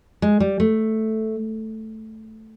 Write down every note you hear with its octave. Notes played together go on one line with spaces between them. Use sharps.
G#3
G3
A3